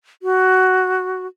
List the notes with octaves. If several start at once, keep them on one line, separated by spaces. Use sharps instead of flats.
F#4